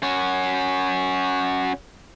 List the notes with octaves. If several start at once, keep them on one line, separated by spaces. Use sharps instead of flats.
C#4 F#4